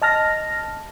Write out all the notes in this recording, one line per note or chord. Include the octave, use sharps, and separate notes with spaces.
D#5 A5 F6 A#6